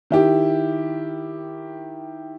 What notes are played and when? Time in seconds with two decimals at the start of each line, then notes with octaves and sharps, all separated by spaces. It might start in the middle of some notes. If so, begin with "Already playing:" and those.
0.11 D#3 E4 G4